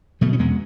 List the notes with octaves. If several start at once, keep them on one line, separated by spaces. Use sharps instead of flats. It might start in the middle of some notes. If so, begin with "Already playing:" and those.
B2 F#3 A3
C#4
E2 G#3 B3